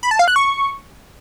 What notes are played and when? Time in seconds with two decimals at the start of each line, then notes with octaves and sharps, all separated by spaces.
0.03 B5
0.11 A5
0.19 F5
0.28 F#6
0.36 C#6